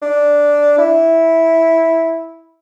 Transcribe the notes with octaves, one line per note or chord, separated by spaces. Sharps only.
D4
E4